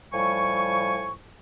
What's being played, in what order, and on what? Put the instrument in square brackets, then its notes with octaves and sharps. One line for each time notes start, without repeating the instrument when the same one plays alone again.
[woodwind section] A2 F3 G3 G#5 C#6